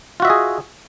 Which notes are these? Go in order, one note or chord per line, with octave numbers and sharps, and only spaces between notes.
F4 F#4 G#4 D#5 E5